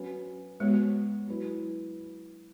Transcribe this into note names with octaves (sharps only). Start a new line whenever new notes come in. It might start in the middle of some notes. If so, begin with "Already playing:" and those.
Already playing: F#3 C#4 F#4 B4
G#3 B3 F#4 C#5
F#3 E4 B4